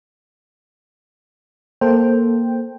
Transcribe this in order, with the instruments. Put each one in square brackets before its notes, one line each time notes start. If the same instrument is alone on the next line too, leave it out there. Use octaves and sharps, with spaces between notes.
[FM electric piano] A#3 A4 C5 G5